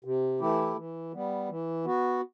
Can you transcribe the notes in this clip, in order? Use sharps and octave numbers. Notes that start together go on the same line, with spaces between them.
C3
E3 A3 E4 G4
E3
G3 B3
E3
B3 F#4